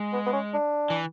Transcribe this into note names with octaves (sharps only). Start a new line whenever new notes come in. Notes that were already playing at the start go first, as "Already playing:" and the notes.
Already playing: G#3
B3
B3
C#4
D4
E3